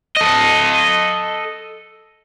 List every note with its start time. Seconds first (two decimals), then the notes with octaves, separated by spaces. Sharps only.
0.16 A4 D#5